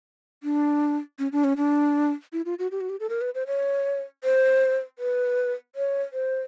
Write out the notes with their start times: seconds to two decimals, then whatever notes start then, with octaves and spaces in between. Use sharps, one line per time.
0.43 D4
1.19 C#4
1.32 D4
1.44 C#4
1.57 D4
2.33 E4
2.45 F4
2.59 F#4
2.71 G4
2.81 F#4
2.90 G4
3.00 A4
3.10 A#4
3.21 B4
3.35 C5
3.47 C#5
4.24 C5
4.99 B4
5.76 C#5
6.13 C5